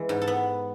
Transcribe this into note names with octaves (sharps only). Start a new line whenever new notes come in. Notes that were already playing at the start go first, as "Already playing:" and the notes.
Already playing: E3 G#3
G#2
A4
B3